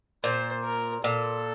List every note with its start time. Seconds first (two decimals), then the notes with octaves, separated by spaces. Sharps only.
0.23 A#2 C5
0.64 A#4
1.04 A#2 A4